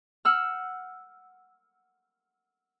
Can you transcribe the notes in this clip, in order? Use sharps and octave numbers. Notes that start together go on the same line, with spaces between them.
F#5 E6 F6